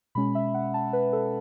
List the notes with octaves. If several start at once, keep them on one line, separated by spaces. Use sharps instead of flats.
B2 G#3 C#4 B5
E5
F#5
A5
B4
A4